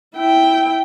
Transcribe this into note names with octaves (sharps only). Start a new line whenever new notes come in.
E4 G5